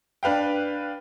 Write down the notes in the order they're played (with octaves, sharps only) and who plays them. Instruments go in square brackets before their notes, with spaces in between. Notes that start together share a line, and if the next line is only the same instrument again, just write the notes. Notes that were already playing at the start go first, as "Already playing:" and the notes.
[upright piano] D4 B4 F5 G5